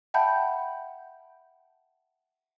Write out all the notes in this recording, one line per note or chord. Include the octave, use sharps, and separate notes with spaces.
E5 F#5 G5 A5 B5 G6